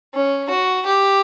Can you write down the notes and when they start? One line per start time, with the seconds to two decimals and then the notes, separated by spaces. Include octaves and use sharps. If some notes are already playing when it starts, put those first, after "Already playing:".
0.15 C#4
0.50 F#4
0.86 G4